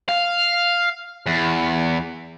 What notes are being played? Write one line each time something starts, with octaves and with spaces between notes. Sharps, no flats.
F5
E2